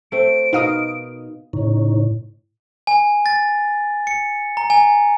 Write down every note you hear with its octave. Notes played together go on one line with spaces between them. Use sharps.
A3 C4 D7
B2 D#4 A#4 F5 D#6
A2 C#3 D#4 C#5
G#5
A6
C#7
A#5
G#5